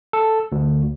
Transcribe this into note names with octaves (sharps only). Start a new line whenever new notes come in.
A4
D2